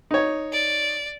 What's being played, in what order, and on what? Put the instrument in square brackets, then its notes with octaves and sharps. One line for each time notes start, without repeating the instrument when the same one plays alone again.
[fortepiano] D#4 C#5
[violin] D5